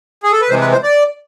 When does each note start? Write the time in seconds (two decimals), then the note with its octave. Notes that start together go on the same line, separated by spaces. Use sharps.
0.23 G#4
0.32 A4
0.41 B4
0.50 C3 E3 G#3 C5
0.61 B4
0.72 C5
0.83 D5